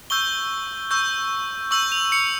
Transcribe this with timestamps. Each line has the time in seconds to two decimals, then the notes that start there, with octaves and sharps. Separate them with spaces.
0.10 C#6 E6 G6 G7
0.91 C#6 E6 G6
1.71 C#6 E6 G6 F#7
1.92 F7
2.12 C#7